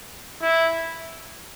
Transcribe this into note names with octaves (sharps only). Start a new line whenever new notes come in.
E4